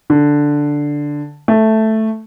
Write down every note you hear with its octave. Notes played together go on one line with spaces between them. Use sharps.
D3
A3